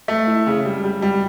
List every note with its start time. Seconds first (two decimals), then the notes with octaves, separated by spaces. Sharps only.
0.08 A3
0.27 E4
0.47 C#3
0.65 G3
0.84 G3
1.02 G3